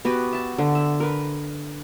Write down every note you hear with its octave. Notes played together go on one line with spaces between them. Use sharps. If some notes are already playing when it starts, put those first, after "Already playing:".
B3 F#4 G4 B4
E5 A5
D3
E5
A#4 B4